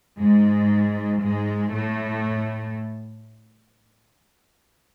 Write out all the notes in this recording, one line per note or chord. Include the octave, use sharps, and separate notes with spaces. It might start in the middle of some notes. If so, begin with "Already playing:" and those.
G#2 G#3
G#2 G#3
A2 A3